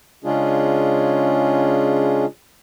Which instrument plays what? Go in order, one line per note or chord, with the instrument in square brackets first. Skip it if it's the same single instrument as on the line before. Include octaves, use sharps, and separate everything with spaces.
[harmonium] C#3 G#3 C#4 D4 F4 G#4